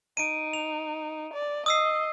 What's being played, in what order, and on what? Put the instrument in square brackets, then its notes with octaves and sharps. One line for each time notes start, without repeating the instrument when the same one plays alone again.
[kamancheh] D#4 [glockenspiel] D7 D#7
[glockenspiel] F7
[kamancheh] D5
[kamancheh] D#5 [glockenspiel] D#6 E6 C7